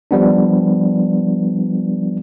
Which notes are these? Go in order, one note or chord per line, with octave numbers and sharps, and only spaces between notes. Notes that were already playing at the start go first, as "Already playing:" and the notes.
F3 G3 B3 D4